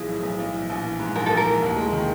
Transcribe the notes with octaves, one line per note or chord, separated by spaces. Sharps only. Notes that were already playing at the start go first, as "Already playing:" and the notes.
Already playing: B1 E3 F3 G#4
A2
B1
B1
E3
A#1
E3
G#2
A#1 A#4
A#1 A4
A#4
E3
D#2
G#3
D#3